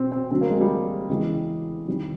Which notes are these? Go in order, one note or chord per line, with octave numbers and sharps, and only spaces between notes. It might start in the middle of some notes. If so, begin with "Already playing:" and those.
Already playing: B2 C4
C4
D2 D3 F#3 C4
A#3
G#3
G3
E2 C#3 E3 G#3
F2 C3 D#3 G3